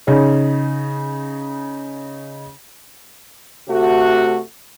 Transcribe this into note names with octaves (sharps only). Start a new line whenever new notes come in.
C#3 D#4 G#4 C#5
C3 A3 F#4